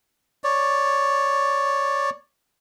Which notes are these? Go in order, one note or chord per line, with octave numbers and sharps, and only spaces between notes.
C#5 D5